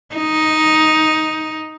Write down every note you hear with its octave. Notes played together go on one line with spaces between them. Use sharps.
D#4